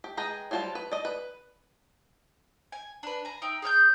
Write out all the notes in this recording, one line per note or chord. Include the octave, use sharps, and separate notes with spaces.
G4
G#3 G#4 B4 G5 A#5
F#3 G3 F4 C5 A5
B4
D5 D#5
B4
G#5
D4 B4
G#5 A#5
D#4 E5 G5
G#4 C#5 F6 G6